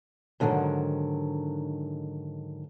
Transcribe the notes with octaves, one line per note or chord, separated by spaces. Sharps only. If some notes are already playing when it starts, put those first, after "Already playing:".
G#2 D3 D#3 F3 F#3